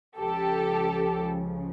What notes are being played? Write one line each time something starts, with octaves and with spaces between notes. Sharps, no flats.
C#2 C#3 F3 G4 A4